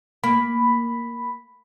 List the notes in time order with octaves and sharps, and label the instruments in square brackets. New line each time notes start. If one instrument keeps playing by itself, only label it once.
[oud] A#3 [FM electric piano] B5